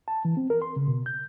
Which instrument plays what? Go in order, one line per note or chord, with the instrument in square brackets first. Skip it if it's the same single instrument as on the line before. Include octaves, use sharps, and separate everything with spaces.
[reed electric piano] A5
E3
C4
A#4
C6
C#3
B2
G6